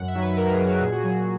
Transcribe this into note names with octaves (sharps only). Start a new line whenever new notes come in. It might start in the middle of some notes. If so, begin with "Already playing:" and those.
Already playing: F#2 F#5
E5
D#3 F#3
B4
F#2 A#4
G#4
D#3 F#3
F#4
A#2 G#4
F#4
F#3 G#4